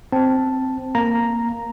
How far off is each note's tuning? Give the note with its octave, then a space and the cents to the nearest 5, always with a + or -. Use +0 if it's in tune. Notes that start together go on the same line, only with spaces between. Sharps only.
C4 +0 A5 +0
A#3 +0 A#5 +0